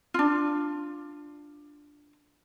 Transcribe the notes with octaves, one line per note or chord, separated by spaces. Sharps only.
D4 F4